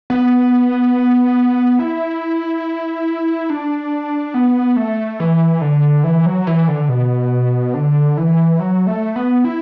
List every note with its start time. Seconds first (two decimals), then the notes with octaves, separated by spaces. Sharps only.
0.10 B3
1.79 E4
3.50 D4
4.34 B3
4.77 A3
5.20 E3
5.61 D3
6.04 E3
6.26 F#3
6.47 E3
6.68 D3
6.89 B2
7.74 D3
8.17 E3
8.60 F#3
8.87 A3
9.16 B3
9.44 E4